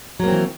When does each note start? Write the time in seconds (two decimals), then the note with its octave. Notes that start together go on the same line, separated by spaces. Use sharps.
0.20 F#3
0.24 A#3
0.28 C4
0.32 E3